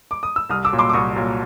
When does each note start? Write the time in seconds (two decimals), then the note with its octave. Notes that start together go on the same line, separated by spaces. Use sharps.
0.11 D6
0.23 D#6
0.36 E6
0.49 C2 D#6 F6
0.65 D6 E6
0.72 A#2 F#3
0.79 C6 D6
0.89 D6
0.93 C2 C#6 D#6
1.16 A#2 F#3